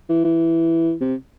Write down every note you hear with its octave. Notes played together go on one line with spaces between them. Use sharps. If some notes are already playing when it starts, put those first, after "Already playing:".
E3
E3
C3